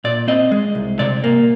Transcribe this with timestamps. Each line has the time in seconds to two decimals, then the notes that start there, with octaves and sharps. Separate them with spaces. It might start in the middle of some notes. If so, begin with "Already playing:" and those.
0.04 A#2 D5
0.28 C4 D#5
0.52 G#3
0.75 C2
0.99 C3 D5
1.24 A#3